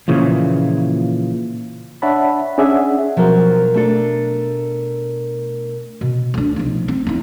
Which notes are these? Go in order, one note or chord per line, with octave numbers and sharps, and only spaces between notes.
A#2 C#3 E3 F3
D4 C#5 E5 F#5 A5 B5
C#4 D4 G#4 D5 E5 F#5
B2 F3 F#3 A#4
A3 D4 A4
B2
D2 D4
B1 F3
C4
E2 E4